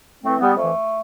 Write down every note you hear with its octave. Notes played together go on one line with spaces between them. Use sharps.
A2 E3 A3 C4
G3 B3
F2 E3 A3